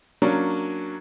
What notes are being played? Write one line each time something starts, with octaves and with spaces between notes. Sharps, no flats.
F#3 A#3 C#4 D4